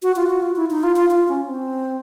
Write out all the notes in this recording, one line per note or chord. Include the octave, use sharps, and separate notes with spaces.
F#4
F4
F#4
F4
E4
D#4
F4
F4
F4
C#4
C4